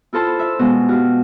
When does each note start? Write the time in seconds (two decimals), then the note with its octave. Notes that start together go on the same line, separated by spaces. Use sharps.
0.13 E4 F4 A4 C5 A5
0.39 E5
0.59 B2 G#3
0.89 F#4 G4 F5